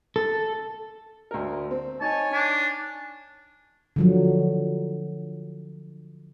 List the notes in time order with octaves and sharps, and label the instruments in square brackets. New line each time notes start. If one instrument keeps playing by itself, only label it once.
[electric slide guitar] A4
[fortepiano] D2 A#4
C4
[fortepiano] D#4 [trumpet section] C#5 G#5 [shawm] A5
[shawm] D4
[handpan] D3 F3 F#3